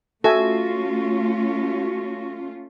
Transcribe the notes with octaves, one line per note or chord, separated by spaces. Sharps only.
A3 C#4 F4 F#4 A4 E5 G#5